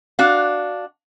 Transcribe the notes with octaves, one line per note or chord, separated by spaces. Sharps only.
D4 F#4 F5